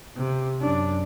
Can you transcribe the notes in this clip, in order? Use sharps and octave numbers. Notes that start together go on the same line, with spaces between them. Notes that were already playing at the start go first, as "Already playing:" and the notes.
C3
F#2 D4